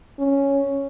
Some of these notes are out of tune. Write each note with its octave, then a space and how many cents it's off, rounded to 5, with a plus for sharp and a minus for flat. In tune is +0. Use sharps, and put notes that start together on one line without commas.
C#4 +0